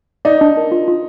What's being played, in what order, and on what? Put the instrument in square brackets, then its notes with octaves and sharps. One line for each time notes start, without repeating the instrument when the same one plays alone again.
[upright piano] D#4 [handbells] D5
[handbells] D4
A#4
F4
F4